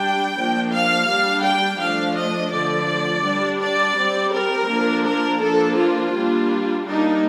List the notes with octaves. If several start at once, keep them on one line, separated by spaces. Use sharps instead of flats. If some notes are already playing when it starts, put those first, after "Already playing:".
Already playing: G3 D4 G5
F3 A#3 D4
F5
G3 D4
G5
F3 A3 D4 F5
D#5
D3 F3 A3 D5
G3 D4
D5
G3 C4
A#4
F3 A#3 D4
A#4
F3 A#3 D4 A4
F4
G3 A#3 D4
G3 A#3 D4 D#4